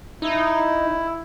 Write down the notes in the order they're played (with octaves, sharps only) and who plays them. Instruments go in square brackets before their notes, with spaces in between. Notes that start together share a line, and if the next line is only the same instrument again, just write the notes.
[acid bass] D#4 [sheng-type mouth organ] E4